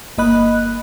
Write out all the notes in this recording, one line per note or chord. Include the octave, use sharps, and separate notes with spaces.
G1 A#3 D#5 B5 F#6